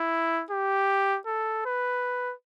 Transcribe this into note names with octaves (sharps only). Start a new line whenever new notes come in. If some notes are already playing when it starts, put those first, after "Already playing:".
Already playing: E4
G4
A4
B4